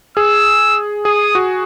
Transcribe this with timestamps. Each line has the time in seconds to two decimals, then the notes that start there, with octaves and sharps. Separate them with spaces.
0.17 G#4 E6
1.05 G#4 D#6
1.35 F#4